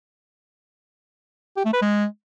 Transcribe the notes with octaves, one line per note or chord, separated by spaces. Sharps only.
G4
A3
B4
G#3